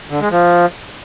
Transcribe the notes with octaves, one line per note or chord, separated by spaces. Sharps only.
D3
G#3
F3